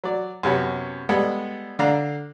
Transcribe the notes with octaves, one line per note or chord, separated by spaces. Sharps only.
F#3 D5
F#2 C3 B3 C#4
G3 G#3 B3 A4
D3 D4 F5 A#5